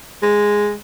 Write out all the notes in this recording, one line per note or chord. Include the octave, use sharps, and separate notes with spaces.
G#3